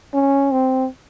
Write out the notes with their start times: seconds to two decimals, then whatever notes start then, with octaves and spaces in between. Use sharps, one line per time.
0.14 C#4
0.52 C4